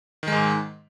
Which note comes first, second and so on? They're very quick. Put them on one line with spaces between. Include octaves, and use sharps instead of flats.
D#3 G#3 G#2